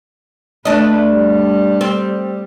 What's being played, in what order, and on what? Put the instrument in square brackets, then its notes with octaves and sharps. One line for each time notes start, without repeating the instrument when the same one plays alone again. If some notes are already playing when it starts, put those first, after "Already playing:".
[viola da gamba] A3 B4 [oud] D4 D#5
[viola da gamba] G3
[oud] C4